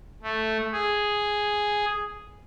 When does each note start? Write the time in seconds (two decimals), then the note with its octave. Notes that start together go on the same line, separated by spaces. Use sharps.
0.22 A3
0.72 G#4